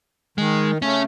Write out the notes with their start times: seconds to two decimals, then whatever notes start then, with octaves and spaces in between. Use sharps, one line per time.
0.38 D#3 G#3
0.82 C#3 A3 C#4